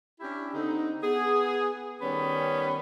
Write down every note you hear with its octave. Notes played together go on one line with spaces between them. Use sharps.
C#4 D4 E4 G4
D3 C4 D#4
B3 G#4
D#3 G3 B3 C#4